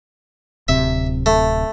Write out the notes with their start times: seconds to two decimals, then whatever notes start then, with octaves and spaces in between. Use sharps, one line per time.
0.68 D1 C3 E5
1.26 A3